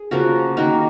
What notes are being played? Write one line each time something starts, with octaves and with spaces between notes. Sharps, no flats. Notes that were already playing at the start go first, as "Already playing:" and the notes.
Already playing: G#4
C#3 F3 A#3 F#4 A#4
D#3 A#3 F#4 A#4